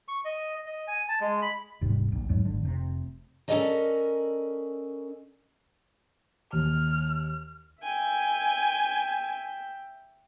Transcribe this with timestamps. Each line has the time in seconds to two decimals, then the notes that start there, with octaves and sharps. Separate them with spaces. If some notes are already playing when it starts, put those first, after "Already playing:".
0.08 C#6
0.25 D#5
0.67 D#5
0.87 G#5
1.09 A5
1.21 G#3
1.42 B5
1.81 D#1 G#2 C3 G3
2.12 A#1
2.29 E2 G#2 F#3 G#3
2.45 G#1 D3
2.63 F1 C3
3.48 C#4 A4 A#4 D5 D#5 A#5
6.53 D#2 F6
7.82 E5 G5 G#5